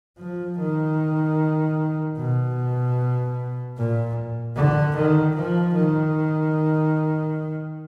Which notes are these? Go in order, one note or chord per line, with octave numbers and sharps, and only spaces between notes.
F3
D#3
B2
A#2
D3
D#3
F3
D#3